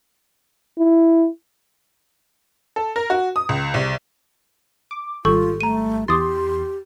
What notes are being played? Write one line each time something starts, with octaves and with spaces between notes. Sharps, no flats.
E4
A4
A#4
F#4
D#6
C#2
C2
D6
G#1 G3 F4 A4 C#6 G6
A3 A#5 D#7
E2 G4 C6 D6 D#6 A6